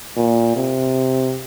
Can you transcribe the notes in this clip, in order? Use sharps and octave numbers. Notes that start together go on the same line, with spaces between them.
A#2
C3